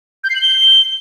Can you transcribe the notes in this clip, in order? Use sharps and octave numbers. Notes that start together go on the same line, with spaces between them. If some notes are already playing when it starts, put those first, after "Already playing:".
G6
C7
F#7
G7